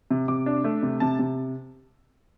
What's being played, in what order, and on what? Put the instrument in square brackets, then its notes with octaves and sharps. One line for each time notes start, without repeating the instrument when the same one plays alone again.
[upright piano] C3
C3 D6
D4
A3
C3
C3 A5
C3